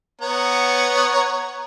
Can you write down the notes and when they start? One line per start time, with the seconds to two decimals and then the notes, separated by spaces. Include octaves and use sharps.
0.21 B3 C#5 A#5